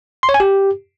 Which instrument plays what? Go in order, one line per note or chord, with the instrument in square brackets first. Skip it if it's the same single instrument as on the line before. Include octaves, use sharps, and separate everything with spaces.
[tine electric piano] C6
C#5
G#5
G4